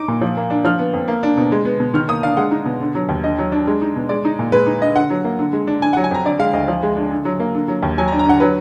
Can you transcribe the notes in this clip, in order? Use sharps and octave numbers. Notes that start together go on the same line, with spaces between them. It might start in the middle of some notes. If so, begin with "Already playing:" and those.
Already playing: D#4 D6
A#2
F3
A#3
D4
F3 F6
B3
F2
A#3
D4
B2
G#3
B3
B2
D#3 F6
A#3 D#6
D4 F5
G#3 F#5
D#4
B2
D3
F#3
D#2
D3 D#5
F#3
D4
G#3
D#4
B2
G#3 D5
D#4
A#2
G#3 B4
D#4
D3 D#5
D3 F#5
F#3
A#3
D3
G#3
D4
D3 G#5
F#3 F#5
G#5
F2 A#5
D3 D5
G#3 F5
D2 D#5
F3
G#3
D4
D3
F#3
A#3
D3
F#3
D#2
F#3 G#5
A#5
D4
A#5
D3 F#5
F#3 B4